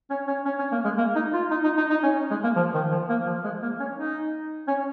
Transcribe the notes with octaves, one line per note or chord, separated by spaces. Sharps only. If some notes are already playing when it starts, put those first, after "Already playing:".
C#4
C#4
C#4
C#4
A#3
G#3
A#3
D#4
F4
D#4
D#4
D#4
D#4
C#4
G#3
A#3
F3
D#3
F3
A#3
F3
G#3
A#3
C#4
D#4
C#4